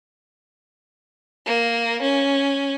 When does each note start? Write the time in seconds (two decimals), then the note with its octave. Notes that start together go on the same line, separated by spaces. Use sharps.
1.46 A#3
2.02 C#4